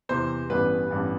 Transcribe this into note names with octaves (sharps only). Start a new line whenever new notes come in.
E2 C3 E3 C5
A1 G2 E3 G3 B3 B4
A1 G2 E3 G3 B3